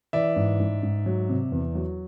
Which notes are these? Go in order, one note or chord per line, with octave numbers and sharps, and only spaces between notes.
E3 D5 E5
G#2
G#2
G#2
F#3
C3
E2
F#3